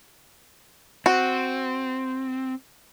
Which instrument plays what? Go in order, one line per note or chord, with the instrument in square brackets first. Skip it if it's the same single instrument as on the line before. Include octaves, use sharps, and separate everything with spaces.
[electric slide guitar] C4 [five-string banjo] F#4